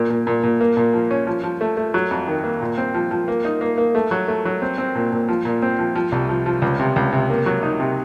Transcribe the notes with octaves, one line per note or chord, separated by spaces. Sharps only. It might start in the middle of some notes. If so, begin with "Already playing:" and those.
Already playing: A#2
A#2
A#2
A#2
A#3
A#2
F3
C#4
F3
F3
A3
A3
F#3
F2
D#3
A#3
A#2
C4
F3
F3
A#3
D#4
A#3
A#3
A3
F#3
A3
F#3
C4
C4
A#2
A#2
F3
A#2
C4
F3
F3
C2
F3
F3
C#2
C3
C#2
C3
A#3
F#3
D#4
C3